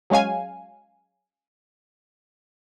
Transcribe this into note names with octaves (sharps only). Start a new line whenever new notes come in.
F#3 G#3 C#4 F5 G#5